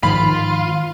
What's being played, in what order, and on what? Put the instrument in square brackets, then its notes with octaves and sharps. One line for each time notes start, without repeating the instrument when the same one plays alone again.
[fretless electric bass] G#2 D#3 F3 [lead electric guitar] F4 [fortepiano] B5